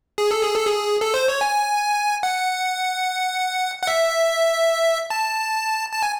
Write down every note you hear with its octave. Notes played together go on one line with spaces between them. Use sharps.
G#4
A4
G#4
A4
G#4
A4
C5
C#5
G#5
F#5
F#5
E5
A5
A5
G#5